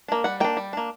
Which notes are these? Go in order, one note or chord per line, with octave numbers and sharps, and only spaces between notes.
A#3 D4
G3 F#5
A#3 D4 G5
G3
A#3 D4